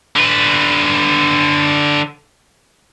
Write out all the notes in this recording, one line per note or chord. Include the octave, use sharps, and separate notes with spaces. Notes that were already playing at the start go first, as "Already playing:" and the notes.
D3 B4